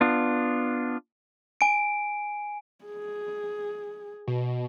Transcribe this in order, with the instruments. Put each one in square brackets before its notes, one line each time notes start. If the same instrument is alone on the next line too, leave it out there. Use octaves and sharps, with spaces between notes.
[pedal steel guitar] B3 D4 F4
[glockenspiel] G#5 D7
[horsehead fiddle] G#4
[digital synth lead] B2